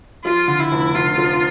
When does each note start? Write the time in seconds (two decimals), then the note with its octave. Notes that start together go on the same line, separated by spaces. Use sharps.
0.25 F3 F4
0.48 D3
0.60 E4
0.71 F1
0.94 D3 F4
1.18 F3